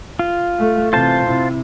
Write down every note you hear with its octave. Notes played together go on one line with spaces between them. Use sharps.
F4
A3
C3 E3 F4 C5 A5
C3 E4